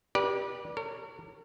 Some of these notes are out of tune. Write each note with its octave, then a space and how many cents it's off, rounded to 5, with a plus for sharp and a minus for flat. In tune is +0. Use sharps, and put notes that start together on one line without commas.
G4 +0 B4 -35 D5 +0
A#4 -40 C#5 +0